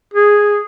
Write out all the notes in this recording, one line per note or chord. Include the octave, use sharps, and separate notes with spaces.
G#4